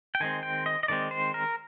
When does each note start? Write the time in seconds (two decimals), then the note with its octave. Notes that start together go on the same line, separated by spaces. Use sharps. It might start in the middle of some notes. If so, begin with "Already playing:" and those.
0.15 G5
0.20 D#3 G#3 C4 G#5
0.43 G5
0.66 D#5
0.83 D#5
0.88 D#3 G#3 C4 D5
1.11 C5
1.34 A#4